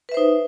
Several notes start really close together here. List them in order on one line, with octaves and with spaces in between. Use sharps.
B4 E5 C5 D#4